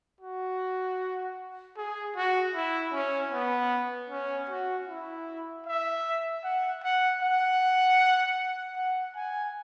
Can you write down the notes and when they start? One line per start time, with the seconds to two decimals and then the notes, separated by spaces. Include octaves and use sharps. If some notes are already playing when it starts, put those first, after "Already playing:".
0.21 F#4
1.77 G#4
2.16 F#4
2.55 E4
2.93 C#4
3.32 B3
4.10 C#4
4.49 F#4
4.88 E4
5.66 E5
6.44 F#5
6.83 F#5
7.22 F#5
8.76 F#5
9.16 G#5